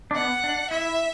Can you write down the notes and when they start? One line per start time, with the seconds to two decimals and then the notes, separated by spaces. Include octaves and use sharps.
0.11 D4
0.15 B3 F#5
0.44 D4
0.71 E4 E5